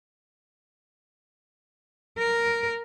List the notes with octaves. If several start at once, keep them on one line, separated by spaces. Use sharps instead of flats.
A#4